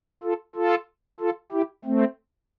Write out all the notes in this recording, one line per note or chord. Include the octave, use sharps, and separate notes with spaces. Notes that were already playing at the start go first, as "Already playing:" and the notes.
F4 A4
F4 A4
F4 A4
E4 G4
A3 C4